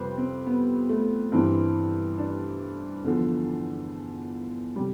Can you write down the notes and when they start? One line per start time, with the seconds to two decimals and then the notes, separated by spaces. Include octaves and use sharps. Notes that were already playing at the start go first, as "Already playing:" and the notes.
Already playing: F2 C3 G3 B4 C5
0.17 C4
0.46 B3
0.89 A3
1.32 G2 E3 G3 C4
2.18 D4
3.04 E2 D3 F3
4.76 C3 G3